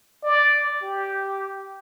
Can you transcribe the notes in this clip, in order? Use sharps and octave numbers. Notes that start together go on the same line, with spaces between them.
D5
G4